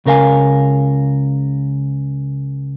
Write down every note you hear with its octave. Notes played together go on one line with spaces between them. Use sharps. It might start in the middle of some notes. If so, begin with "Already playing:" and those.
C#2 C#3 A#4 F5 G#5